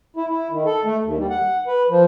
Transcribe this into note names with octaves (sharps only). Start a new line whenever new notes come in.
E4
E4
D#3
A4
A3
D#2
G3
F#5
B4
F3